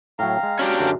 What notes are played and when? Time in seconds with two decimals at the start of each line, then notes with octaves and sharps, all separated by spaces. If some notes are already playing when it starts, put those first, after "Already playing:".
0.19 A2 F#3 F5 G5 A#5
0.43 G#3
0.59 C#4 D4 F#4 G4
0.79 F#2 D3 D5